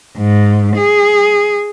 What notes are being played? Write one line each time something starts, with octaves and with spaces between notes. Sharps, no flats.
G#2
G#4